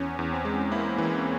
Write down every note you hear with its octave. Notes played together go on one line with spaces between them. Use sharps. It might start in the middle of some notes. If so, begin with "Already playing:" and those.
Already playing: E2 C#4
E2
C4
G#3
A#3 E4
E3